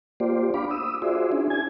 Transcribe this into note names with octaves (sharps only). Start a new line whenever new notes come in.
A#3 F4 G4 C5 D5
D4 F5 B5 D6
D#6 E6
F4 F#4 G#4 C5 D5 E5
C#4 D4 E4 G#4
G#5 G#6